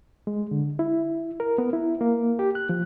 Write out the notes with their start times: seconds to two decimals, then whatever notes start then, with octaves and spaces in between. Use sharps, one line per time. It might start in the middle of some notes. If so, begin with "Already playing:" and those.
0.27 G#3
0.51 D3
0.79 E4
1.40 A#4
1.58 B3
1.73 E4
2.01 A#3
2.39 G4
2.55 F#6
2.69 F3